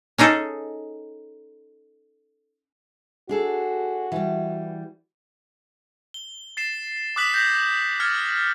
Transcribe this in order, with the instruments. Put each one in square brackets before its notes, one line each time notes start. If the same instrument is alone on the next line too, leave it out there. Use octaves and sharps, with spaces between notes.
[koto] C#4 D#4 G#4 A4
[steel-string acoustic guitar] D4 G#4 A4 [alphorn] F#4
[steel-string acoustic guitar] E3 G3
[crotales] G7
A6 C7 E7
D6 D#6 F#6 B6 F#7
G6 A#6 B6
F6 G#6 A6 C#7